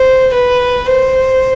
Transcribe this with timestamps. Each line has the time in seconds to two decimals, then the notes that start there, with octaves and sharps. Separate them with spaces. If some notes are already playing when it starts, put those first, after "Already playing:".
Already playing: C5
0.33 B4
0.89 C5